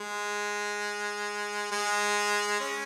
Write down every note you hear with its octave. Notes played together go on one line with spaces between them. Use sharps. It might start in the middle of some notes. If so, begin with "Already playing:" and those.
Already playing: G#3
G#3
C#4